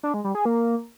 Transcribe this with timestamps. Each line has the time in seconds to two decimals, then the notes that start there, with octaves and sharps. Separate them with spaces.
0.03 D4
0.14 G#3
0.24 G3
0.35 G#4
0.45 A#3